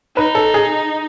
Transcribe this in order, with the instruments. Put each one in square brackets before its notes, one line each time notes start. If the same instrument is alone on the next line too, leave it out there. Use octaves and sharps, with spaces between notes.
[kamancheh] D#4 [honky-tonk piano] B4
[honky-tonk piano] A4
G#4